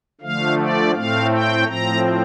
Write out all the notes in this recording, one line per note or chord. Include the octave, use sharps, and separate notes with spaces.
D3 F3 A3 F5
D5
A2 A3 C4 F5
G5
A2 F3 C4 A#5